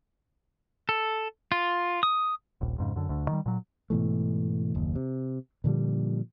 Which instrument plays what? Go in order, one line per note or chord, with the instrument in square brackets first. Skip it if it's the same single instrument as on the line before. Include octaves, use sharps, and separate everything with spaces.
[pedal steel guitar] A4
F4
D#6
[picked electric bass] D#1 A#1
F2 G#2 C#3
F#2 D3
D2 D3
D#3 F#3 G3
A#2 F#3
[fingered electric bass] G#2 B2 E3 A3
F#1 D#2
C3
A#2 D3 F3 G3